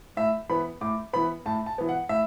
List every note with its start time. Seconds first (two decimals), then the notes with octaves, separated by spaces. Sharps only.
0.17 A2 E5
0.49 E3 B3 B5
0.81 A2 D6
1.13 E3 B3 B5
1.46 A2 A5
1.66 A5
1.78 E3 B3
1.89 F#5
2.09 A2 E5